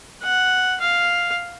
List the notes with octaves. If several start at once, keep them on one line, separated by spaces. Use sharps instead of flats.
F#5
F5